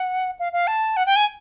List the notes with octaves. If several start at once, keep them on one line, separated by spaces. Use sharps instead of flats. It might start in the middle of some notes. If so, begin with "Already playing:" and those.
Already playing: F#5
F5
F5
A5
F#5
G5
G#5